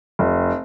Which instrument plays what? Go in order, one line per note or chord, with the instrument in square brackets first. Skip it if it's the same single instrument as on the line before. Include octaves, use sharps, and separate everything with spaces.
[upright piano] F1